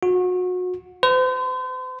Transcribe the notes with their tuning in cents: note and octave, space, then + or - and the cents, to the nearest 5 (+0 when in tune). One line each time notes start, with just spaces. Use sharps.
F#4 -30
C5 -40